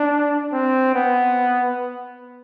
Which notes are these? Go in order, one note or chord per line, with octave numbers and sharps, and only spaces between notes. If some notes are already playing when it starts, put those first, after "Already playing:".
Already playing: D4
C4
B3